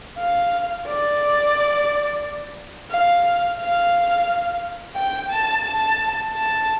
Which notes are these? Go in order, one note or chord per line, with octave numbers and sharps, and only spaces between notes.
F5
D5
F5
F5
G5
A5
A5
A5